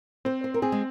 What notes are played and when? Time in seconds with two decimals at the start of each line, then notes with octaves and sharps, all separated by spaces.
0.25 C4 C5
0.44 C5
0.54 A#4
0.62 C4 G#4
0.72 G#3